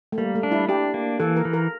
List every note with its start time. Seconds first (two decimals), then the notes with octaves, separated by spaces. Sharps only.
0.12 A3
0.18 G3 A#3
0.35 A3
0.43 D4
0.52 E4
0.69 D4 G4
0.94 A#3
1.19 E3 A4
1.36 A#4
1.45 E3
1.53 A#4